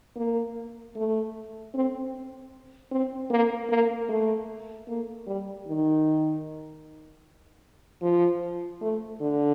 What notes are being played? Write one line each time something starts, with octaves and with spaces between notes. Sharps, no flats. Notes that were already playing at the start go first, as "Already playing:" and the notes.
A#3
A3
C4
C4
A#3
A#3
A3
A#3
G3
D#3
F3
A3
D3